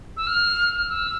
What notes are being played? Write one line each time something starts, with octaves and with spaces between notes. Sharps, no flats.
E6
F6
E6